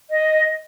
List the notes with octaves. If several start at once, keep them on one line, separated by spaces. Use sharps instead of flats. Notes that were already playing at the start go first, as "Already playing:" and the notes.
D#5